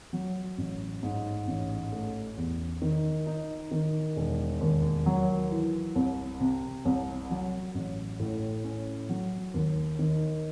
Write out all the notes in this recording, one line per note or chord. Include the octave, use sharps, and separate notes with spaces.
F#3
A1
G#2
A1
A3
E2
D#3
D#4
D#3
E1
D#2
F#3
E3
C2
C3
C2
F#3
A1
A2
C#4
F#3
D#2
D#3